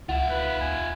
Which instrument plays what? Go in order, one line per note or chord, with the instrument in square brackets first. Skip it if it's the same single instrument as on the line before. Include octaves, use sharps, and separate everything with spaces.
[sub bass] C#2 [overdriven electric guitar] F4 E5 [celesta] F#5
[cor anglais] B4
[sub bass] D#2 [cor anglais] G#5